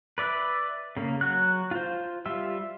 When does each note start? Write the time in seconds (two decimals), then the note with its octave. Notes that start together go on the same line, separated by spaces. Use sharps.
0.18 B4 D5 E5
0.97 C#3 A#3
1.21 F#3 F#4 F#6
1.71 F4 C5
2.26 G3 F4 E5